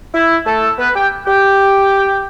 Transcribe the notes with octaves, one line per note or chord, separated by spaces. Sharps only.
E4
A3 A4
B3 B4
G4 G5
G4 G5